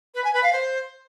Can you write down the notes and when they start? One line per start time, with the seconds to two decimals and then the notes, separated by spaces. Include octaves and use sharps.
0.15 B4
0.24 G#5
0.34 B4
0.43 F5
0.53 C5